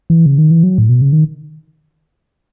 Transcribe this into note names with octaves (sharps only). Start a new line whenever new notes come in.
E3
C#3
D#3
E3
F#3
A2
B2
C#3
D#3